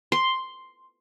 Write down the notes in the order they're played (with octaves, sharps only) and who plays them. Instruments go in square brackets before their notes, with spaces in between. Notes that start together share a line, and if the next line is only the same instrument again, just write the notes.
[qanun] C6